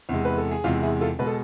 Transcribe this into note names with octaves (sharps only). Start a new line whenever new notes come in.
E2 C3 G#3
B4
A4
G#4
E2 C3 G#3 F4
E4 G#4
F4 A4
B2 G#3 B4
A4